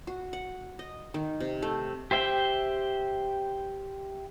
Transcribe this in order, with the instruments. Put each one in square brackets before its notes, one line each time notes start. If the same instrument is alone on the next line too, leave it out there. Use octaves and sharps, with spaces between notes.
[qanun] F#4
F#5
D#5
D#3
C3
A3
[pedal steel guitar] G4 C5 E5 G5